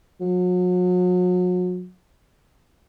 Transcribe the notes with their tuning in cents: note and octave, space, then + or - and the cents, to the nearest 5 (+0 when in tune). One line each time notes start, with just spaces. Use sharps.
F#3 -40